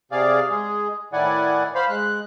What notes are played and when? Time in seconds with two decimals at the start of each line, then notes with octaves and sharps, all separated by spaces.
0.12 C3 G#4 D5 F5
0.51 G#3 G#4
1.13 A2 D#3 E4 D5 F#5 G#5
1.75 C5 F5 B5
1.89 G#3 F#6